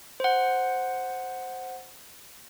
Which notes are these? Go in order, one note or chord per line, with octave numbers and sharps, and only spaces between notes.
C5 F#5